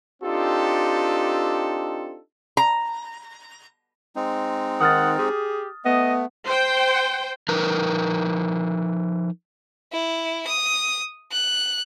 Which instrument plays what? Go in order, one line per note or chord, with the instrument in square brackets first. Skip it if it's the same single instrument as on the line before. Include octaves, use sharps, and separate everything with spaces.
[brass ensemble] C4 D4 D#4 F4 G4 A4
[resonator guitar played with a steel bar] A#5
[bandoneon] G#3 C4 D#4
[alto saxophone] D#3 [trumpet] F#5 [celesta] D#6 F6 A6
[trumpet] G4 [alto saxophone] G#4
[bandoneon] A3 [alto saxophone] B3 [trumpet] D#5
[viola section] C5 G5
[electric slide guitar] F3 D#4 A#4 B4
[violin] E4
D#6
F#6